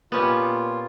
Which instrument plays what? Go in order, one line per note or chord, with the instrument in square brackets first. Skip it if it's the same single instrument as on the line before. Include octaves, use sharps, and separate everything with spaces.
[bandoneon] A#2 F4 [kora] B3 C#4 G4